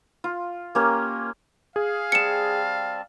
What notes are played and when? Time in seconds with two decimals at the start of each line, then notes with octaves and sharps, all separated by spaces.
0.24 F4
0.75 A#3 C#4 G4 A#4
1.76 G#4 F5
2.12 G3 C4 A5 C#7 E7